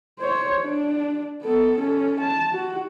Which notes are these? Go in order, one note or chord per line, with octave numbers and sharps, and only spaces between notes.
C5 C#5
D4
B3 A4
C#4 A4
A5
F#4